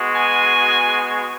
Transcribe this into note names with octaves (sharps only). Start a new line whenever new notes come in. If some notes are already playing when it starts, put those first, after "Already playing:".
Already playing: G#3 B3 F#4
G#5